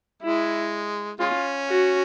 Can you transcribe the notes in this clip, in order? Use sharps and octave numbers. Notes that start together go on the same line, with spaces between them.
G#3 E4
G#3 C#4 F4
F#4